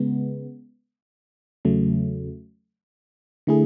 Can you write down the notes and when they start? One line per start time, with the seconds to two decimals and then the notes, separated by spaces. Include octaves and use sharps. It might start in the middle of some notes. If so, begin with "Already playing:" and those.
Already playing: C#3 G#3 B3
1.65 E2 C#3 F#3 A3
3.47 D3 A3 E4 G#4